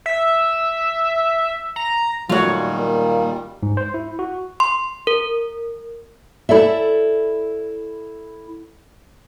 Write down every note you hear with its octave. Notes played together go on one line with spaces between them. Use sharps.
E5
A#5
A#2 D#3 F#3 G3 A3 F4 F#4 C#5
A#3
G#2
C5
E4
F#4
C6
A#4
E4 A4 D5 E5